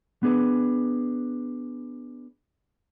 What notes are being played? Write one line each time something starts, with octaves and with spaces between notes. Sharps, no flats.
B3 D4 G#4 B4